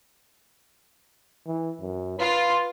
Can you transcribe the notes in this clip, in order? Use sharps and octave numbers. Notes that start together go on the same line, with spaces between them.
E3
F#2
F4 B4